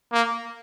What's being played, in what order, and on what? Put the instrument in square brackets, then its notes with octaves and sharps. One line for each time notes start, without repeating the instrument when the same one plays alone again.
[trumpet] A#3